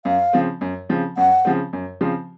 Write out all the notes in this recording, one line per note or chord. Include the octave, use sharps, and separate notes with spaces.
F#2 F5
C#3 F3 C4
F#2
C#3 F3 C4
F#2 F#5
C#3 F3 C4
F#2
C#3 F3 C4